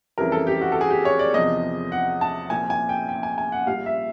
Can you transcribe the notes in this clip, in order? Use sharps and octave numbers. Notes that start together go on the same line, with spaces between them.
F2 C#3 E3 G3 A#4
A4
G4
F#4
A4
G#4
G4
C#5
D5
E2 C3 F3 D#5
F#5
A5
C2 A#2 F3 G#5
G#5
G5
G5
G#5
G#5
F#5
A#1 A#2 G3 F5
E5